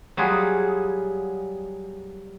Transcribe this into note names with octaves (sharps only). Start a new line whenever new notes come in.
F#3 G3 F4 F#4 G#4